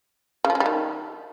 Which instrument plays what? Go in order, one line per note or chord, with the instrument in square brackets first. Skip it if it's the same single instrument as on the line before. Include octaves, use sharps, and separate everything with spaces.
[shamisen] C#3
F3
G#3
G3
D#3